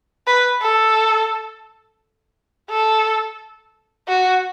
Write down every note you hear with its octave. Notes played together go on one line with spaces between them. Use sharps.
B4
A4
A4
F#4